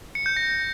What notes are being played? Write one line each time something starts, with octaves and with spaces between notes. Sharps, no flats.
C#7
G6
A#6